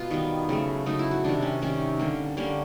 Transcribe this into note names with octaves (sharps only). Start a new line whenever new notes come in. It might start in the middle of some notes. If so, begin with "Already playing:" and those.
Already playing: B2 F4
D#3 G3 B3
C#3 F#3 A3
C#3 F#3 A3 D#4
E4
F#4
C3 D#3 G3 D4
C#4
C3 D#3 G3 C#4
D3 G3 A#3
D3 G3 A#3 C#4